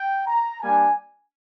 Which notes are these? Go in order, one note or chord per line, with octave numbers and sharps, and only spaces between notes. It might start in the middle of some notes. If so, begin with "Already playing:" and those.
Already playing: G5
A#5
G3 A#3 D4 G#5